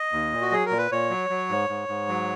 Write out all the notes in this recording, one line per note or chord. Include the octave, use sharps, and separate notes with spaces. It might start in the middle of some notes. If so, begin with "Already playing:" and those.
Already playing: D#5
D#2
A#2
F#4
F#3 G#4
A#4
A#2
B4
A#2 C#5
F#3
F#3
G#2
G#2
G#2
F#3